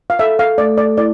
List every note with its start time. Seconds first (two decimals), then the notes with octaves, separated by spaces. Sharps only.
0.10 F5
0.19 A4 E5
0.39 F5
0.58 A3 D5
0.78 D5
0.97 E4 D5